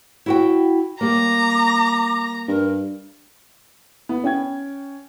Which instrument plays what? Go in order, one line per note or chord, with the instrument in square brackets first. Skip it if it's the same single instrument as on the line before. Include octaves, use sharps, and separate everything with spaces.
[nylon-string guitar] E4 F#4 G5
[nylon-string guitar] G3 A#3 [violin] A#5 [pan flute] D6
[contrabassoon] G2 [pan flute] A#4
[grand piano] B3
C#4 G5 G#6